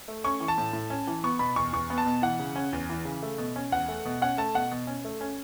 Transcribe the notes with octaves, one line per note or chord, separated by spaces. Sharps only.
A3
C#4 C#6
E3
A5
A2
A2
C#4
E3
B3 C#6
B2 B5
E2 C#6
E2 C#6
B3
A5
B2
E3 F#5
C#3
C#4
E2
E3
C#3
A3
B2
C#4
E2 F#5
A3
B2
C#4 F#5
A3 A5
B2 F#5
B2
C#4
A3
C#4